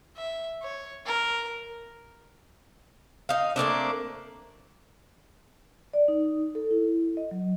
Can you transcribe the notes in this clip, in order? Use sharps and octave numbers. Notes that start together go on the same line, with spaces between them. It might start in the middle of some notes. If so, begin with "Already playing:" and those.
E5
C#5
A#4
D#4 F5
A3 A#3 C4 D4
D5
D#4
A4
E4
D#5
F#3